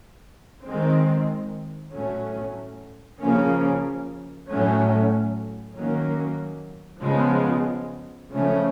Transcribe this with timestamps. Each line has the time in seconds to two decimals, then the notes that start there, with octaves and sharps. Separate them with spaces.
0.66 D#3 G#3 C4
1.94 A2 F#3 A3 C#4
3.21 C#3 F3 A#3 C#4
4.49 A2 F#3 A3 C#4
5.76 D#3 F#3 A#3 C#4
7.03 C#3 F3 G#3 B3
8.31 C#3 F3 A3 C#4